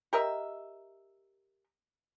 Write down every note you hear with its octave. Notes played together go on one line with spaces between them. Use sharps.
G4 A#4 D#5 E5